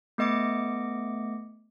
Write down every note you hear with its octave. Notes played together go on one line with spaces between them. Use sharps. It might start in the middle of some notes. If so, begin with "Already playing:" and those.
A3 B3 D#5 D6 C#7